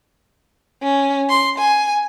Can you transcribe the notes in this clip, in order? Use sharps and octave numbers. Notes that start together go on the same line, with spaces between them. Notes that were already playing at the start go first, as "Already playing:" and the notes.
C#4
C6
G#5